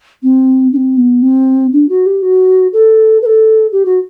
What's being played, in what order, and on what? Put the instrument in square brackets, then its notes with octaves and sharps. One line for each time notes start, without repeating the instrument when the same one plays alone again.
[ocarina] C4
D4
C4
B3
C4
D4
F#4
G4
F#4
A4
B4
A4
G4
F#4